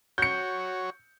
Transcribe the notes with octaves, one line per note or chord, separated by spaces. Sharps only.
F#4 C#5 G6 C#7